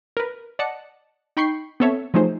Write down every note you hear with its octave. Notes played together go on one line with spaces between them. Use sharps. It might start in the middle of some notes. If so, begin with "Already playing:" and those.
A#4 B4
D5 D#5 F#5 A5 C#7
D#4 G5 B5 C#6 G6 C7
B3 C4 A4 C#5 E5
F3 F#3 A3 D#4 G#4 C5